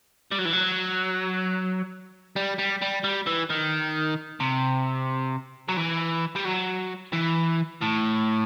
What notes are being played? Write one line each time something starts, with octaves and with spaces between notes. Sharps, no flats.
G3
F#3
E3
F#3
G3
G3
G3
G3
E3
D#3
C3
F#3
E3
G3
F#3
E3
A2